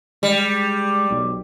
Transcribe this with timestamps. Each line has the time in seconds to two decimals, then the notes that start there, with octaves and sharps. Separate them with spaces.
0.23 G3 G#3
1.10 B1